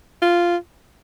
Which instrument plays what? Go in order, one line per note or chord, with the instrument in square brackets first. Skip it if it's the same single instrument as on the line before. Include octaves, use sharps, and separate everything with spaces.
[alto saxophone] F4